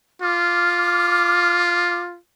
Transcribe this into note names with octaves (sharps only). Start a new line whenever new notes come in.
F4 D6 F6